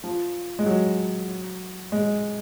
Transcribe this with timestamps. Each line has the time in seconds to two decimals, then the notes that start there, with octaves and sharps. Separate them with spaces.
0.04 F3
0.59 G#3
0.66 F#3
1.92 G#3